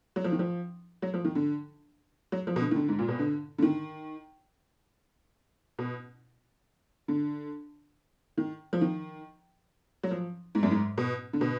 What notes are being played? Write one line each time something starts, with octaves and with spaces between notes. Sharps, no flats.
F#3
F3
D#3
F3
F#3
F3
D#3
D3
F#3
F3
B2
D3
D#3
D3
G#2
A#2
B2
D3
D3
D#3
B2
D3
D#3
F3
D#3
F#3
F3
G#2
F#2
G#2
B2
D3
B2